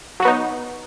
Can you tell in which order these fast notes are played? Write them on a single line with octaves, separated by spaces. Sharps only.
F#3 F#4 B3 D#4